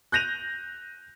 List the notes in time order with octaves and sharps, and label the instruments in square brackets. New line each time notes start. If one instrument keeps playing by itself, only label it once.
[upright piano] F#6 G6 A#6 D#7 F7